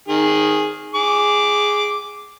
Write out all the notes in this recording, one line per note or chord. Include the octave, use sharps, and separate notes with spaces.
D#3 G#4
G#4 D6